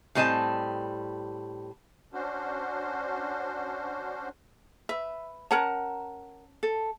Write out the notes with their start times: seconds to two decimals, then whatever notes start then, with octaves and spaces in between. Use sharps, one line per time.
0.15 A2 G3 C4 D#5 G#5 A5
2.13 C#4 D4 F#4 C5
4.89 B4 E5
5.51 C#4 A#4 F#5 A5 A#5
6.63 A4